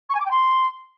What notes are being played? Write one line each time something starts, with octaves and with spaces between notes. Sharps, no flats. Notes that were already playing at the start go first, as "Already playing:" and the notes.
C#6
G#5
D6
G5
C6